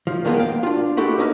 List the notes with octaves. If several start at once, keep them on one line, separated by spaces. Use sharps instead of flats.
F3
F2 F3 G#3 A#3 B3
F5 G5
D4 F4
E4 F#4 G4 A4
C#4 D#4 B4